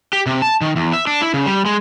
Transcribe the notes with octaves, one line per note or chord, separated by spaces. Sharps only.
G4
C3
A5
D#3
E2
E5
D4
E4
C#3
G3
G#3